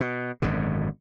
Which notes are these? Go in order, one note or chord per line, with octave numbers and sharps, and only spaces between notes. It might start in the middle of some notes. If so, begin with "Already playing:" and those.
B2
G#1 F#2 B2 D3